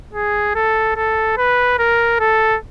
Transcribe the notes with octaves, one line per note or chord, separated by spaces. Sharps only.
G#4
A4
A4
B4
A#4
A4